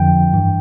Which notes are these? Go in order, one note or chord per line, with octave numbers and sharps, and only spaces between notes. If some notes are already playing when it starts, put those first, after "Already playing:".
Already playing: F2 D3 F3 G5
G2 E3